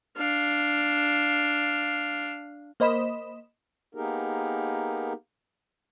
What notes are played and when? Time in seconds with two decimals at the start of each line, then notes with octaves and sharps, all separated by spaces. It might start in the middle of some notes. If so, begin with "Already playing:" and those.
0.17 D4 F5
2.80 A#3 C5 D#5 B5 E7
3.95 A#3 B3 D#4 G4 G#4 A#4